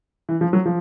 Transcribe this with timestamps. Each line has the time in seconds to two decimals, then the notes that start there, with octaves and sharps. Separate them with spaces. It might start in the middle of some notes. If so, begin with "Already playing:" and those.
0.29 E3
0.41 F3
0.53 F#3
0.66 F3